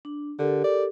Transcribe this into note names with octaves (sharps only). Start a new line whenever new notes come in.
D4
D3 G4 A4 A#4
D5